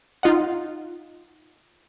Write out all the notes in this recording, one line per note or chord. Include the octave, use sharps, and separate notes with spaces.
D#4 F4 D#5 F#5